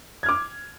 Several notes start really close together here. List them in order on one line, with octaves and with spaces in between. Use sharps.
G#6 F6 D6